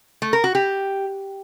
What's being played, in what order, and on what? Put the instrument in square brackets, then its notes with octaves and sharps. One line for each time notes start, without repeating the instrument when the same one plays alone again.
[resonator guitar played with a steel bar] A3
A#4
F#4
G4